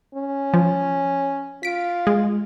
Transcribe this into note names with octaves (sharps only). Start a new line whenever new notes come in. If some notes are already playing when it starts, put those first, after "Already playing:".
C#4
F3
F4 B6 D7
G#3